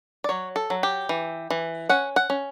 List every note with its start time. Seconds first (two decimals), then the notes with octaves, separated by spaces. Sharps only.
0.24 D5
0.29 F#3 C#5
0.56 A4
0.70 F#3
0.83 G4
1.09 E3
1.50 E3
1.89 C#4 F#5
2.16 F#5
2.30 C#4